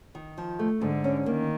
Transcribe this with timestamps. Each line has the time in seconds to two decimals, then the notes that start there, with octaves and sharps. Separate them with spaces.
0.15 D#3
0.38 F3
0.59 A3
0.81 G#2 D3
1.04 C#4
1.26 D#3 A#3